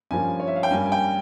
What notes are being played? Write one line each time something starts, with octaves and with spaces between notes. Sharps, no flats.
G2 F3 A#3 C#4 G#5
C#5
E5
F5
G5
G2 G3 A#3 C#4 G#5
G#5
G5